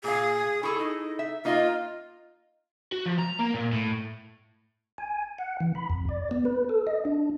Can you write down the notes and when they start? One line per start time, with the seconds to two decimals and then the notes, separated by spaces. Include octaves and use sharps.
0.04 A#2 G#4 F5
0.63 E4 G#4 A4 C#6
0.78 D#4
1.19 E5
1.45 A#3 D#4 F4 D#5
2.92 F#4
3.06 F3
3.18 A#5
3.39 A#3
3.54 A#2
3.72 A2
4.98 G#5
5.38 F#5
5.60 E3
5.75 B5
5.90 F2
6.09 D5
6.31 B3
6.45 B4
6.69 A4
6.87 D#5
7.05 D4